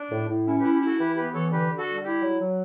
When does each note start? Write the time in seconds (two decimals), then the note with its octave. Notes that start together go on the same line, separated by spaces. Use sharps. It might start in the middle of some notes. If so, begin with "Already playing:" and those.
Already playing: D4
0.12 A2
0.29 A2
0.47 C#4 E4
0.60 G4 B4
0.64 E4
0.73 G4
0.81 E4
0.86 F#4 A4
0.99 E3 G4 B4
1.16 B3 G4 B4
1.34 E3 A4 C#5
1.51 D3 G4 B4
1.70 D3
1.78 F#4 A4
1.88 G3
2.04 E4 G4
2.22 F#3
2.40 F#3